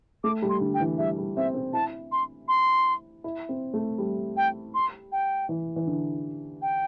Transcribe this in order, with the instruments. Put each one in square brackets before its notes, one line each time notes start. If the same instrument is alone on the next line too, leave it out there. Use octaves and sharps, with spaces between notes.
[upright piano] A3 [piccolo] D6
[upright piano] G3
[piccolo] C6
[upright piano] D3
[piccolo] G5
[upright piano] E3
[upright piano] G3 [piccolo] E5
[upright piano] G3
[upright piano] C4 [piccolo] E5
[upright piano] C4
[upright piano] E4 [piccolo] A5
[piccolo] C6
C6
[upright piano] E4
C4
A3
G3
[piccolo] G5
C6
G5
[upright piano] E3
E3
D3
[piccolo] G5